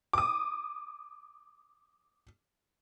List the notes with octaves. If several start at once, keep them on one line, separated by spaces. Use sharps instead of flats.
D6 D#6